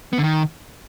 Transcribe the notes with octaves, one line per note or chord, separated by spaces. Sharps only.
B3
D3
D#3